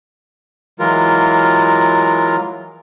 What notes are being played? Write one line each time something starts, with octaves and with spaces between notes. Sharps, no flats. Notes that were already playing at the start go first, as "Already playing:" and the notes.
E3 F#3 G#3 F4 A#4